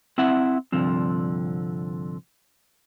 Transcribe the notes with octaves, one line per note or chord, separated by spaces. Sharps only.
C4 E4 E5 F#5
C2 G2 D3 F3 C4